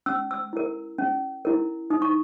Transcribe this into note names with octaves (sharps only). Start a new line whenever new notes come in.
C#4 E6
E6
E4 A#4
C#4
E4 A#4
D#4 D#6
C#6